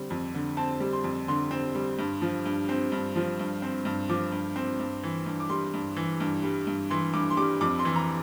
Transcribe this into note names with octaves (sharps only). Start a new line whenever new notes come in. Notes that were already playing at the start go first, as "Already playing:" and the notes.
Already playing: D3 G3 C4
F2
D3
C4 A5
G3
C6
F2
D3 C6
C4
G3
G2
F3
G2
C4
G2
F3
G2
C4
G2
F3 D6
G2
C4
G2
E3
G2
D6
G3 C6
G2
E3
G2
G3
G2
E3 C6
G2 D6
C6
G3 D6
F2 D6
C6
E3
A#5